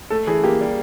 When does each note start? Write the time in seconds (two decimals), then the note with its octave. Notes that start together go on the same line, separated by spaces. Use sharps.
0.10 A3 A4
0.27 E3 G#4
0.43 A#3 G4
0.61 G3